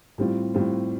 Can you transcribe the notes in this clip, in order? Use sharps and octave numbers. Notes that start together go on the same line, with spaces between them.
A2 G3 C4 F4
A2 G3 C4 F4